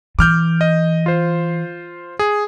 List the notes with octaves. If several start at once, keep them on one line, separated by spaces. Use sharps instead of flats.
E3 D6 F6 G6
D#5
F4 C5
G#4